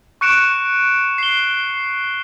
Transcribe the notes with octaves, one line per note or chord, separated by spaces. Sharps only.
C#6 F#6 C#7 D7 E7
C7 G7